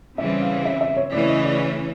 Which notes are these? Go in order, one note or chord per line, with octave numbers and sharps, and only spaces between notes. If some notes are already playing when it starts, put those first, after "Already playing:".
C#3 E3 G3 C4 E5
F5
E5
E5
C#5
C#3 E3 A3 C#4 D5
D#5
D5